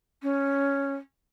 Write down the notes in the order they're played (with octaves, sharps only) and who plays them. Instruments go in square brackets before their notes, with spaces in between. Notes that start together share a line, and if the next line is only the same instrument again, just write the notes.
[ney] C#4